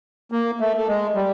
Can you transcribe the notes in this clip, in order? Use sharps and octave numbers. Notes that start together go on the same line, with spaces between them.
A#3
A3
A3
G#3
G3